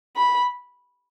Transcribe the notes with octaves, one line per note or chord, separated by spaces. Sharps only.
B5